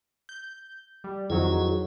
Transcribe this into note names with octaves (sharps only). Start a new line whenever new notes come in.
G6
G3
F2 D#3 F#3 E4 G#4